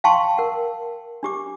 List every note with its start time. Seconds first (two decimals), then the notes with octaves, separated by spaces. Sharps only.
0.04 F5 G5 A5 C6 C#6
0.38 A#4 F#5
1.23 D4 G4 D6